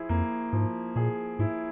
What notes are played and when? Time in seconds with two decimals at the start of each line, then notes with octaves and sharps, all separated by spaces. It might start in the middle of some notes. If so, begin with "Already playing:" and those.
Already playing: F3 E4 G#4
0.09 F2 A#3
0.53 G#2 F3
0.96 A#2 G#4
1.39 G#2 E4